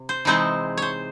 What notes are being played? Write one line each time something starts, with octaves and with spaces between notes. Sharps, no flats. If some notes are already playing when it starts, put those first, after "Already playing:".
Already playing: C3
C5
C3 E3 G#3 C4 D#4 C5
C5 C#5